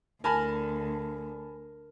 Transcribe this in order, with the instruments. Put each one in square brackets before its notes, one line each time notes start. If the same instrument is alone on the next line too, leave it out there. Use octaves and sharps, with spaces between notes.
[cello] D2 [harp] A#4 [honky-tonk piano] G#5 A5 B5